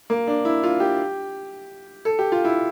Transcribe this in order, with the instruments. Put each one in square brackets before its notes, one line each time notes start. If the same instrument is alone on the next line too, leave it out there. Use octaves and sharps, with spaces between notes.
[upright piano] A#3
D4
E4
F4
G4
A4
G4
F4
E4